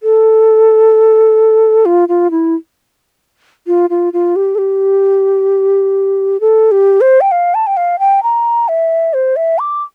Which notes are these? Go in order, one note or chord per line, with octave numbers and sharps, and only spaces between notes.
A4
F4
F4
E4
F4
F4
F4
G4
A4
G4
A4
G4
C5
G5
F5
A5
G5
F5
G5
A#5
E5
C5
E5
D6